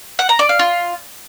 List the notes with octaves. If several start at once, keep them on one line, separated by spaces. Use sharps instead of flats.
F#5
A#5
D5
F5
F4